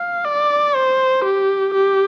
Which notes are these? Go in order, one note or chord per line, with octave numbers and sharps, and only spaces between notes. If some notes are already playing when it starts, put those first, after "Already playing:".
Already playing: F5
D5
C5
G4
G4